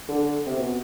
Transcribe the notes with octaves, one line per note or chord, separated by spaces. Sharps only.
D3
D3
C3
B2